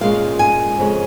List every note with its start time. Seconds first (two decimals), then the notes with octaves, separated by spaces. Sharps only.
0.01 A#2 G#3 C#4 F5
0.39 G#5
0.78 F2 C#3 G#3 C#4